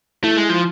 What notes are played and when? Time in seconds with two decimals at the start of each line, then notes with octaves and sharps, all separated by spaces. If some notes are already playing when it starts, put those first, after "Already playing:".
0.24 A3 E4
0.37 G#3
0.49 F3